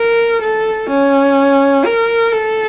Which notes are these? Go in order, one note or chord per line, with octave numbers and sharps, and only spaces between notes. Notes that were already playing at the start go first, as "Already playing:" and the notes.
Already playing: A#4
A4
C#4
A#4
A4